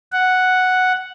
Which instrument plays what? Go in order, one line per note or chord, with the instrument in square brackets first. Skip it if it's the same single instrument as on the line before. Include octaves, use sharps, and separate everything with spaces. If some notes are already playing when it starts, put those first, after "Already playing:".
[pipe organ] F#5